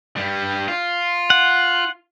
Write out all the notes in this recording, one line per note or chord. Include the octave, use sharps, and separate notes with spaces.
G2 G3
F4
F#5